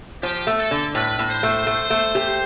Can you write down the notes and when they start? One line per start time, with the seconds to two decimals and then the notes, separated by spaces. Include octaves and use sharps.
0.23 F3 G4
0.47 A3
0.59 A4
0.71 D3
0.95 A2 B4
1.19 A2
1.30 C5
1.43 A3
1.67 A3
1.90 A3
2.15 G4